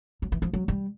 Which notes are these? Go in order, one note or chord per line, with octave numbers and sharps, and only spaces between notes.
F#3
E3
F3
F#3
G3